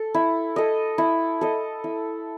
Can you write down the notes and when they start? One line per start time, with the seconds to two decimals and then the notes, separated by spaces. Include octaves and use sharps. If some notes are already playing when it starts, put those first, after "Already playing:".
Already playing: A4
0.14 E4
0.56 A4 D#5
0.98 E4
1.41 A4 D#5
1.84 E4